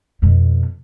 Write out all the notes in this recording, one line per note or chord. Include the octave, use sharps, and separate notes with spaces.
F2 B2